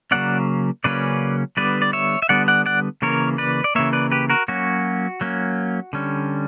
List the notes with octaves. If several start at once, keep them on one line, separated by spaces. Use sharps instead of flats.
C#3 F#3 A#3 C#4 D5 F#5
C#3 F#3 A#3 C#4 B4 D5
D3 G3 B3 B4 D5
D5
C#5 E5
E5
D3 G3 B3 D5 F#5
D5 F#5
D5 F#5
C#3 E3 A#3 A#4 C#5
B4 D5
D5
C#3 E3 A#3 C#5 E5
B4 D5
G4 B4
F#4 A#4
F#3 A#3 C#4 F#4
F#3 A#3 C#4
D3 G3 C#4